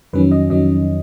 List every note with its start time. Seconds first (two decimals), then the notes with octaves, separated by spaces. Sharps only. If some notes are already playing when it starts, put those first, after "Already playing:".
0.13 F2 D#3 F#3 C#4 B4
0.31 D#5
0.50 F2 D#3 F#3 C#4 D#5